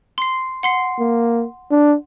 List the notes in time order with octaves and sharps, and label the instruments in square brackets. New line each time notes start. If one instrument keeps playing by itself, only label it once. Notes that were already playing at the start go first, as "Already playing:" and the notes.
[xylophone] C6 C7
F#5 C6 C7
[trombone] A#3
D4